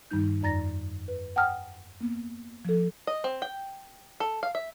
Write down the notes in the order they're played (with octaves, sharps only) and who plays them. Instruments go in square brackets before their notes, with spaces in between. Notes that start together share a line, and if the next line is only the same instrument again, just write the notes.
[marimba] G2 D#3 G3 D#4 G6
F2 D#4 D5 A#5 A6 A#6
B4
F#5 G5 A5 D#6 F6
A#3 B3
F3 A4
[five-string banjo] D#5
C4
G5
A4
F5
E5